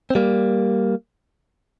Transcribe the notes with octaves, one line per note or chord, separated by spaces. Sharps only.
C4
G3 A#3